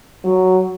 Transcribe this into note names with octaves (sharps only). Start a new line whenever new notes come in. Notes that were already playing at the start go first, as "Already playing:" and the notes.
F#3